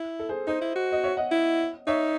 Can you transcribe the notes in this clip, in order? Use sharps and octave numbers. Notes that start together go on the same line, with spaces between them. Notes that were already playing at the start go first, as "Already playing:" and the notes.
Already playing: E4
A4
G#4 C5
D#4 C5 D#5
E4
F#4
D#5
C#5 E5
D#5 F#5
E4
D#4 C#5 E5